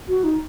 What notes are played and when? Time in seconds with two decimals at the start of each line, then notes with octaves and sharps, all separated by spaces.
0.08 F#4
0.24 D#4